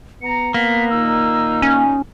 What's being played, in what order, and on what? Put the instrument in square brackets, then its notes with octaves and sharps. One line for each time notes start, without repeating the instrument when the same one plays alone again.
[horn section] B3 A#5 [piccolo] C#7
[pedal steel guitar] A#3 [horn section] B3 [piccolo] B6
[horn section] A#2 D#3 D#4 [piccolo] E6
[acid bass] C#4